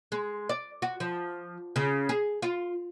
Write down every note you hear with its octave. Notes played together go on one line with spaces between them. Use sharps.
G#3
D5
F#4
F3
C#3
G#4
F4